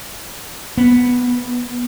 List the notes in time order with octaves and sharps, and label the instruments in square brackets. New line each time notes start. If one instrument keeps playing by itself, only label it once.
[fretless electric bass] B3